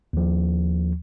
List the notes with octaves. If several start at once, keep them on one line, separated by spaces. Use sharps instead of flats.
D#2 F3